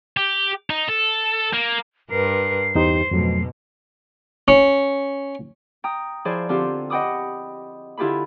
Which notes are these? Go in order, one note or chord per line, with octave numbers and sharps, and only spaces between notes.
G4
D#4
A4
A#3
G2 A#4 B4 C7
E2 D#4 G4 C5
F2 G#2 B2 F#3 A3
C#4
G5 A#5 D#6
F3 E4 G#4 C5 D5
D3 C4 F4 G4 C5
D#5 F#5 G5 B5 D6 D#6
D3 E4 F4 G4 G#4 B5